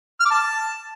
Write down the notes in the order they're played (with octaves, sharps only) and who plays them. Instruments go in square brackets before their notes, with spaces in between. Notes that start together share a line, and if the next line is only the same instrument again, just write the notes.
[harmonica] F6
D6
A5